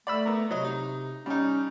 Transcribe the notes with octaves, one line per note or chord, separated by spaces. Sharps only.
A3 D5 B5 E6
B3 A#4
C3 F#3 D#5
D#4
G3 C#4 D#4